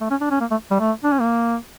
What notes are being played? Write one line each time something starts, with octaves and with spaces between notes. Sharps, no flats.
A3
C#4
D4
C#4
A#3
A3
G3
A3
D4
C#4
A#3